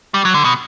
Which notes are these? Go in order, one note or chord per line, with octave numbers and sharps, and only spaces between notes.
G3
F#3
D3
B2